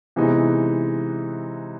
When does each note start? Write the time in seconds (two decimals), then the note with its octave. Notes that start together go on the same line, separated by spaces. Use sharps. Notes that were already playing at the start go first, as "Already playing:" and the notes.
0.16 C3 E3 G#3 B3 D#4